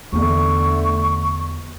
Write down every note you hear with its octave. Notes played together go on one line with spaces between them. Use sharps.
E2 D3 A3 B3 C#6